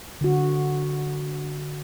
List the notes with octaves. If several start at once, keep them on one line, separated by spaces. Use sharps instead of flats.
D3 F#4